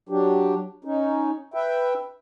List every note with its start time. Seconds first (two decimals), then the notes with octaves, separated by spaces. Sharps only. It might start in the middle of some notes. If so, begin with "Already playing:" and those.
0.09 F#3 D4 G4
0.85 C#4 D#4
1.54 B4 E5 G5